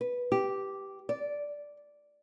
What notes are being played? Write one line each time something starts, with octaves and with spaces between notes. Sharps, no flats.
B4
G4
D5